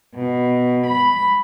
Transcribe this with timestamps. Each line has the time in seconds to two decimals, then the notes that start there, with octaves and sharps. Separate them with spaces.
0.14 B2
0.86 B5